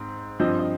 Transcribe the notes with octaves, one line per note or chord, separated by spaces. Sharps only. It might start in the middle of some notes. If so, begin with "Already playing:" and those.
Already playing: G#2 C4
G2 F3 C4 D#5
D#5